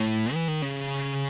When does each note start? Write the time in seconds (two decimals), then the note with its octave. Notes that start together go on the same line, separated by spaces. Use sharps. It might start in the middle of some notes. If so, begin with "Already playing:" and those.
Already playing: A2
0.34 E3
0.48 D#3
0.62 C#3